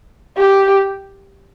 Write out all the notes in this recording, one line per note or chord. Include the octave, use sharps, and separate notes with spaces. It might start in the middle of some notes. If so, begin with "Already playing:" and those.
G4